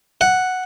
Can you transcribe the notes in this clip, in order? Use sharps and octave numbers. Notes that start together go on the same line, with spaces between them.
F#5